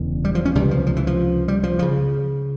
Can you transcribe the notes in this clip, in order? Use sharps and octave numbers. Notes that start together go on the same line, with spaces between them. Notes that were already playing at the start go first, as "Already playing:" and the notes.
Already playing: E1 E2 C#3
G3
F3
C#4
C#2 C3 G3
F3
F3
E3
F3
G3
F3
F3
C#3